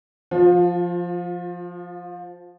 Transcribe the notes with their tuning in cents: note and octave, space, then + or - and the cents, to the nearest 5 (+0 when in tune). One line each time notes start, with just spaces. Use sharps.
F3 +0 F4 +30